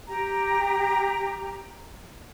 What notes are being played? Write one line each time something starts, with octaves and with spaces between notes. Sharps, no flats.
G4 A#5